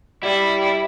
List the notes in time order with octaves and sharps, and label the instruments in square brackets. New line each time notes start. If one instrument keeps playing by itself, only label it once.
[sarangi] G3 [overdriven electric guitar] E4